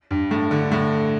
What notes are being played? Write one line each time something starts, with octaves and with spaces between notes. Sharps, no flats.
G2
A2
D3
A2